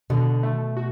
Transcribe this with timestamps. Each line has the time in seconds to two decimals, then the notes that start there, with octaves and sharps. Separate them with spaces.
0.10 B2 D3
0.43 A3
0.77 F#4